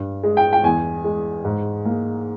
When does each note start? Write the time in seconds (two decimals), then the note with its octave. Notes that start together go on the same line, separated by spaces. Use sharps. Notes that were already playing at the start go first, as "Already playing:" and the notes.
Already playing: G2
0.23 G#3
0.37 G5
0.53 G5
0.64 E2 G#5
1.04 G#3
1.45 G#2
1.85 A#3